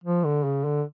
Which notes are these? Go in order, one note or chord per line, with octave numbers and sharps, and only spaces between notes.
F3
D3
C#3
D3